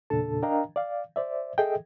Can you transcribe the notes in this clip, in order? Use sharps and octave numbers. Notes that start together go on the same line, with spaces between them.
E2 A#2 C#3 D4 A4 A5
D4 A#4 D#5 F5 G5 A#5
D5 F5
C5 D5 E5
G#4 A4 D#5 E5 G5